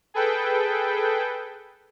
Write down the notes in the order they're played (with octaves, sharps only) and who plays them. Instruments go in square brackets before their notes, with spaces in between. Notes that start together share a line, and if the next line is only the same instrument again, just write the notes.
[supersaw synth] G#4 A4 B4 G5